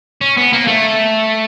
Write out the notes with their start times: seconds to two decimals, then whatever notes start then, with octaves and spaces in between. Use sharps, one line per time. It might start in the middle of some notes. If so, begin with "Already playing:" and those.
0.21 C#4
0.37 B3
0.53 A#3
0.67 A3